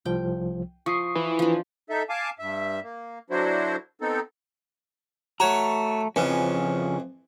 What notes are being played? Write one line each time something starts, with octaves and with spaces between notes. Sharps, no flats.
C2 F3 G5
F3 C#6 D#6 C7
E3
F3 D4
D#4 A4 E5
F5 G#5 A5 D6
G2 E5
A#3
D3 F#3 D4 E4 F#4 C5
B3 C4 D#4 A4
A3 F#4 C#5 A#5
F2 C#3 E3 F3 C#4